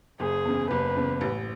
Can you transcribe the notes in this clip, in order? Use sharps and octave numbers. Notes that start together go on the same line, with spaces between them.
F#1 G#4
E2 C#3
F#1 B4
E2 C#3
A1